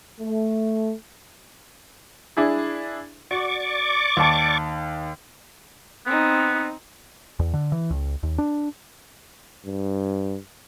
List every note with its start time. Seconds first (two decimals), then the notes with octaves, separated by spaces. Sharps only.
0.20 A3
2.37 D4 E4 G#4
3.31 F#4 D5 C#6 D6
4.17 D#2 A5
6.06 B3 C4 D#4
7.39 E2
7.53 D3
7.72 E3
7.90 C#2
8.23 D#2
8.38 D4
9.65 G2